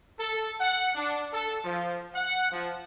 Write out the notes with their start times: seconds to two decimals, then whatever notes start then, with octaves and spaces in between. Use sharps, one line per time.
0.20 A4
0.61 F#5
0.95 D4
1.33 A4
1.65 F3
2.15 F#5
2.52 F3